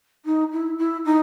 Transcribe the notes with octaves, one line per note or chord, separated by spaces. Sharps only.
D#4
E4
E4
D#4